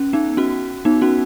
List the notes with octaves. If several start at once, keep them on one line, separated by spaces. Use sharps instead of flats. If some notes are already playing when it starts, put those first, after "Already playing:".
Already playing: C#4
B3 D#4
C#4 F#4
B3 D#4
C#4 F#4